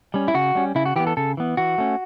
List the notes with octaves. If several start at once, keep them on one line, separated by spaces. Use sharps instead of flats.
G3 C#4
E4
C#3 F#4
G3 C#4
C#3 E4
F#4
E3 B3 G4
A4
C#3 A4
E3 B3
E3 F#4
A3 C#4